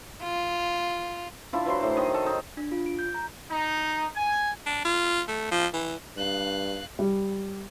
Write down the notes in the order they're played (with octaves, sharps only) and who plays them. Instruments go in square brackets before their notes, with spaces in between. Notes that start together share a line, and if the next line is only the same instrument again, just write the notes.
[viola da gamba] F4
[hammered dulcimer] D4 E4 F4
E3 F#3 C5 C6
A2 C5
D#3 D#5
A4
D#4
[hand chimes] D4
F4
D7
G6
A#5
[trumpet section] D#4
G#5
[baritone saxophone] D4
F4
A3
F3
E3
[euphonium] G2 [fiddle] F5 F#6
[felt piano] G3